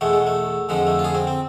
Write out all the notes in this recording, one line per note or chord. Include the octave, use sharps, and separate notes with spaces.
E2 B2 G#3 A3
G#3
A3
F2 D3 F3 G#3
A3
F4
G#4
C4
C4